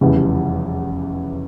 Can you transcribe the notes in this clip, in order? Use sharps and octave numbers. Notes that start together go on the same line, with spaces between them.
F1 E2 C#3 E3 G3